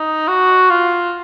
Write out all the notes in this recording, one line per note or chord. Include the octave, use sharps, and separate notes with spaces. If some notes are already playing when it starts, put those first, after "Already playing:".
Already playing: D#4
F#4
F4